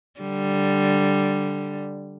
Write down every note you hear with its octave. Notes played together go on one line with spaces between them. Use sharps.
D3 G3